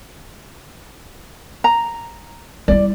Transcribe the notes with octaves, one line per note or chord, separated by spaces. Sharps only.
A#5
G3 E4 D5